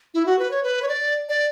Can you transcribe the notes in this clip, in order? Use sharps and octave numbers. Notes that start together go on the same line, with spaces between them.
E4
F#4
B4
C#5
B4
C#5
D5
D5